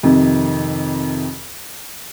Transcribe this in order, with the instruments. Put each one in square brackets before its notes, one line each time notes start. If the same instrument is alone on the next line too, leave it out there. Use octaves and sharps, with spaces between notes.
[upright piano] F2 C3 D#3